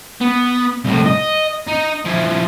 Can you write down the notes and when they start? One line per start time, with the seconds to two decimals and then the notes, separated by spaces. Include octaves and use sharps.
0.21 B3
0.85 C2 A2
1.06 D#5
1.68 D#4
2.05 F3 E4